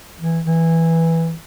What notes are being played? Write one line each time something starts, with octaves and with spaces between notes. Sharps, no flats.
E3
E3